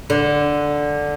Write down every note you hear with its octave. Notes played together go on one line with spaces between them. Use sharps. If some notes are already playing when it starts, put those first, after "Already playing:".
D3